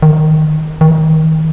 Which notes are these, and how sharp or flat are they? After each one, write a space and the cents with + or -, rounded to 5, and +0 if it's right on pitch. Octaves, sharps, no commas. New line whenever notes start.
D#3 -5
D#3 +25